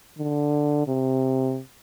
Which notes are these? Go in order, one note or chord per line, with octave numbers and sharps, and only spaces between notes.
D3
C3